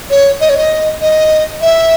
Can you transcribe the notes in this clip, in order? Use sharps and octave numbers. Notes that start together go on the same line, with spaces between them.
C#5
D#5
C#5
D#5
D#5
E5